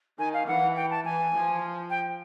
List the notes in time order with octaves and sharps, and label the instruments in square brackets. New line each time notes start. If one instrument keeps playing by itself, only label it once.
[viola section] D#3 [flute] G#5
[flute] F5
[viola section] E3 [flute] F#5
[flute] G5
A5
[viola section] E3 [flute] G#5
[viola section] F3
[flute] G5